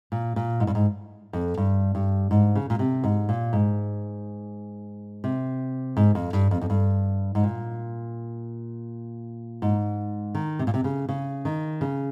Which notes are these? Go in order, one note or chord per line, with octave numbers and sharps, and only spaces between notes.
A#2
A#2
G#2
G2
G#2
F2
G2
G2
G#2
C#3
A#2
C3
G#2
A#2
G#2
C3
G#2
F2
G2
F2
F2
G2
G#2
A#2
G#2
D#3
C3
A#2
C3
C#3
C#3
D#3
C#3